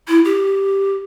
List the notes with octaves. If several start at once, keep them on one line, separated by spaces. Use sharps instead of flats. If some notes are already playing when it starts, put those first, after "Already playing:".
E4
G4